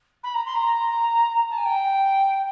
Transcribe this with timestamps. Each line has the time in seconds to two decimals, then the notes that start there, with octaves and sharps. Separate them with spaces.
0.23 B5
0.34 A#5
0.45 C6
0.55 A#5
1.50 A5
1.58 G#5
1.65 G5